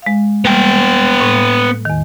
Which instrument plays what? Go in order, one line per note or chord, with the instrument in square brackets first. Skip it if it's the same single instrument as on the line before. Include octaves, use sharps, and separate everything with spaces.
[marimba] G#3 F5
[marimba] G3 A#3 [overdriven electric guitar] B3 G5
[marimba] A2 A#3
E2 D#3